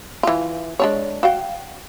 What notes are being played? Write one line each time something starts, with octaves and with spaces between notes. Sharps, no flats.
E3 F4
G#3 D4 C#5
F#4 F5 G5